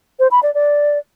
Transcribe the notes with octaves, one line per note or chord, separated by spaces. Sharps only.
C5
B5
D5
D5